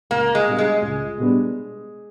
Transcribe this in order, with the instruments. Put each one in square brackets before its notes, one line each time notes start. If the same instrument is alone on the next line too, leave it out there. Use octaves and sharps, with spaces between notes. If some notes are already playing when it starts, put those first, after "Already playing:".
[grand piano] C#2 [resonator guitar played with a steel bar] A#3
[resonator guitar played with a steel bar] G#3
[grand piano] B2 G3 B3 D4
[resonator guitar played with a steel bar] G#3
[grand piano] C#2
B2 G3 B3 D4